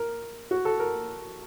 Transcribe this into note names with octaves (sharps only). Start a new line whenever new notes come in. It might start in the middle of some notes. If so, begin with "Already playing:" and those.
Already playing: A#4
F#4
A4
A#4